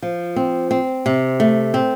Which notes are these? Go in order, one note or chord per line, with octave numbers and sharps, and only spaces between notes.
F3
C4
C4
C3
A3
C4